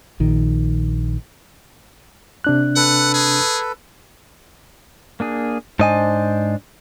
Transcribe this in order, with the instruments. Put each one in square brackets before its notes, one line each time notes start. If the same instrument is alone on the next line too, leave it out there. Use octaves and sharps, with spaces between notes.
[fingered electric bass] A#1 D#3
[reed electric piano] C3 D4 F#6
[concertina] A4 B4 [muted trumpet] F#5
[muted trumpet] G#4
[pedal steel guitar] A#3 D4 G#4
[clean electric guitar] G#2 D#5 G#5 [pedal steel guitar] D4 C5 A5